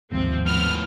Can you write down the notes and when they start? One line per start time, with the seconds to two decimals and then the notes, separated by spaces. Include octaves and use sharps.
0.11 A1 D#2 G#2 C3 F3 C4
0.46 A2 F3 B3 F6